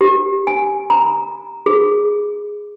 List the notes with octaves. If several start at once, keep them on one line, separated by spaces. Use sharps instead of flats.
G4
G#5
A#5
G#4